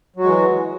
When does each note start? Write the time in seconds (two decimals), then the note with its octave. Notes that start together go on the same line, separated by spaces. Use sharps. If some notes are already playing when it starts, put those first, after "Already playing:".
0.16 F#3
0.20 F#4
0.23 G#3
0.27 E3